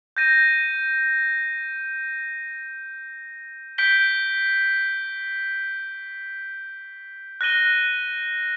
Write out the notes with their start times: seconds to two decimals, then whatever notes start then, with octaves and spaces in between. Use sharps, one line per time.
0.17 G6 A#6 D#7
3.78 G6 B6 D7 G7
7.41 F#6 A#6 D#7 G7